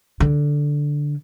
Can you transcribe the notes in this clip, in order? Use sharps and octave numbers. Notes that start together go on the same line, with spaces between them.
D3